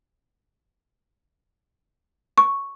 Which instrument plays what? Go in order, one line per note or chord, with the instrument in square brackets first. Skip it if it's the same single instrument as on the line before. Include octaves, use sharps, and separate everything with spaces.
[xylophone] C#6